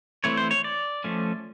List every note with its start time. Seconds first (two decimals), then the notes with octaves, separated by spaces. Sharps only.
0.24 E3 A3 C4 C#5
0.37 C5
0.51 C#5
0.64 D5
1.04 F3 A3 C#4